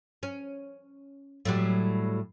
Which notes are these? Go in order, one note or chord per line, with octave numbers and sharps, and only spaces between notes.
C#4
A2 F#3 G3